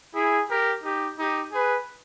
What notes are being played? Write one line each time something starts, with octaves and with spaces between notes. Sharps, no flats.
E4 G#4
G4 A#4
D#4 G4
D#4 G4
G#4 B4